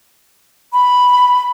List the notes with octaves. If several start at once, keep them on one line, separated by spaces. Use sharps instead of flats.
B5